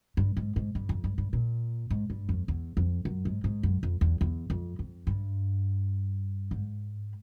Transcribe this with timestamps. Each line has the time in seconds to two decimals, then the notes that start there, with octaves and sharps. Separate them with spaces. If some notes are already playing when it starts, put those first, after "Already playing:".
0.17 G2
0.37 G#2
0.56 G#2
0.75 G2
0.89 F2
1.04 G2
1.18 G2
1.33 A#2
1.90 G#2
2.10 G2
2.29 F2
2.48 E2
2.77 F2
3.05 F#2
3.25 G#2
3.44 G#2
3.63 F#2
3.83 F2
4.01 E2
4.21 E2
4.50 F2
4.79 F2
5.07 G2
6.51 G#2